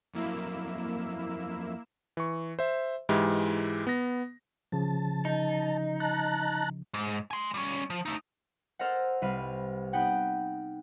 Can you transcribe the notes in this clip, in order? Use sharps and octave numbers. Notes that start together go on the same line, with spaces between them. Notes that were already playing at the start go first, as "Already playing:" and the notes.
F2 F#3 A#3 E4 E6
E3 C#6
C5 E5
G#2 E3 G#3 E4 G4
B3 A#6
C#3 F3 A5
D#4
A5 A#5 F#6
G#2
G#5 C6
G3 C#4
F3
A3 D#4
A4 A#4 C5 D#5 F#5
C2 B4 F5 D#7
B3 D#4 F#5 G5